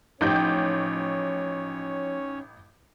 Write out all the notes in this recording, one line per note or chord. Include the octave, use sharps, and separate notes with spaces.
A1 F3 C#4 D#4 G4 C#5 G5 G6